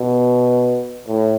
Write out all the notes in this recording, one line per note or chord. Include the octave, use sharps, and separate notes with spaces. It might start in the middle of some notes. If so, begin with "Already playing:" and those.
Already playing: B2
A2